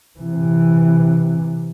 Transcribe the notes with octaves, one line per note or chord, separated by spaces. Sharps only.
C3 E3